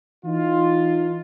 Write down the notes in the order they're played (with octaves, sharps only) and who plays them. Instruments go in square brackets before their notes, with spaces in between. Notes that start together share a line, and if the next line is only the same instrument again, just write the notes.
[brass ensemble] E3 D#4 F4